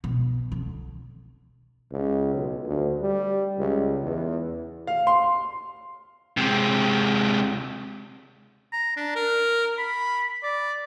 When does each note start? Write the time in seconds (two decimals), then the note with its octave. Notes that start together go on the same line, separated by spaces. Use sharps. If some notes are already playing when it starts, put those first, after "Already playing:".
0.04 B2
0.52 D3
1.92 C#2
2.34 B1
2.66 D2
3.01 G3
3.58 C#2
4.02 E2
4.87 F5
5.07 C6
6.37 C3 G#3
8.73 A#5
8.96 D4
9.15 A#4
9.78 B5
10.43 D5